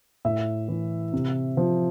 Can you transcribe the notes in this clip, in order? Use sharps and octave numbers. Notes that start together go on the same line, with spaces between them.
A2 E5
E3
C3
F3